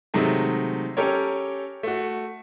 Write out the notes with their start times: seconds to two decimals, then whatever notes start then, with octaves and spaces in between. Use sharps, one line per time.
0.14 C3 D#3 F#3 G#3 A3
0.97 C#4 G4 A4 A#4 C#5
1.83 A3 F#4